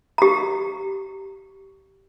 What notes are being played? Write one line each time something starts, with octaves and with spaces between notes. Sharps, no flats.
G4 A#5